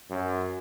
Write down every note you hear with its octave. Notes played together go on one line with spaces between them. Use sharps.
F#2